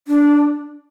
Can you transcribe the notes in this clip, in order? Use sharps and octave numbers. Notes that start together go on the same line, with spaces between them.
D4